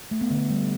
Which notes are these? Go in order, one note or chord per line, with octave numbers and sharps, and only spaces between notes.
A3
B3
D3
G3